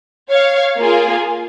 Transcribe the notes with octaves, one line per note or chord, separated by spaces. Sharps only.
C#5 F5
A#3 F4 G#4